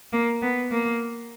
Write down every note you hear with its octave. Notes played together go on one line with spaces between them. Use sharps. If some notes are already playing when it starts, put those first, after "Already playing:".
A#3
B3
A#3